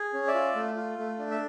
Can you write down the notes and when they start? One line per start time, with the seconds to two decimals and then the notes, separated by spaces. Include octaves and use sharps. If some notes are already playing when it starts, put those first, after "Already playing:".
Already playing: G#4
0.13 C#4
0.28 D5 E5
0.34 F4
0.55 A3
0.77 F4
0.98 A3
1.19 D4
1.31 E5